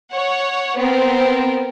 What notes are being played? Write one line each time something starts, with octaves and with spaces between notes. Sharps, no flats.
C#5 F#5
B3 C4 A#4